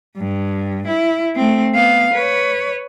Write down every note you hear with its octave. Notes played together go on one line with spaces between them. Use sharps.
G2
E4
A3 C4
B3 F5
B4 C#5